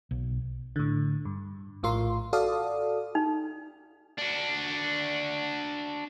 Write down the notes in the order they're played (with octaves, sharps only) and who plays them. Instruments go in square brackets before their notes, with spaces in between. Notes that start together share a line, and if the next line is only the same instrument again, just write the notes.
[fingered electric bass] B1
[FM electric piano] A2 D3
G2
A#1 A2 F4 A#4 C6
F#4 A4 D5 F5 D#6
[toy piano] D#4
[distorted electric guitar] D4 F#4